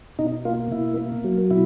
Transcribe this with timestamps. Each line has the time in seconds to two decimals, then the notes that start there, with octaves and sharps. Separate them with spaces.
0.19 B2 D#4
0.45 A#3 F4
0.71 B2 E4
0.98 A#3
1.24 F#3
1.50 B2 E4